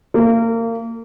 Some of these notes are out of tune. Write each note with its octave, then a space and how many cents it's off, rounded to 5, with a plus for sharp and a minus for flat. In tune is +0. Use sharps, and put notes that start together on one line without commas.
A#3 -30